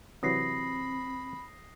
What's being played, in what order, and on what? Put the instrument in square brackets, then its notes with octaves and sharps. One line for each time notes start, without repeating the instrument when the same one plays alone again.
[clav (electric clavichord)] C3 E3 F#3 [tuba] C4 [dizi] B5 [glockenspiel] D#6 A#6 C7